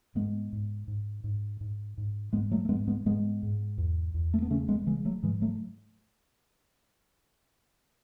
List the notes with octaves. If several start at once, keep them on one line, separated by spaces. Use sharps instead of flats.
G#2 G#3 B3
G#2
G#2
G#2
G#2
G#2
G#2 G#3 B3
F#3 A3
A3
G#2 G#3 B3
G#3 B3
G#2 G#3 B3
G#2
E2
E2
A3
B3
C#3 A3 C#4
G#3 B3
C#3 E3 G#3
F#3 A3
G#2 E3 G#3
F#3 A3